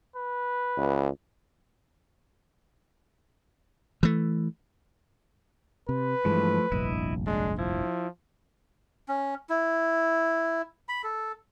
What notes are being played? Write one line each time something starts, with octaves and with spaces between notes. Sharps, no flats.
B4
C#2
E3 A3
C3 B4
G2 E3 F3 G#3 A3
F1 A#1 G2 E4 D#5
G#3 D4
F3 E4
C#4
E4
B5
A4